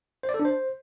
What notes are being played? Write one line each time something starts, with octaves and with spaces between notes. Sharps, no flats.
C5
D5
A4
D4
C5